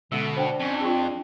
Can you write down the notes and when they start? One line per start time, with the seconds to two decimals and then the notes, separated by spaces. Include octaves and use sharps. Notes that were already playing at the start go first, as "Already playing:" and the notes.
0.12 B2 D3 G#3 C#4
0.37 D4 C5 F#5 G5
0.60 F2 C#4
0.81 C4 F4 G#4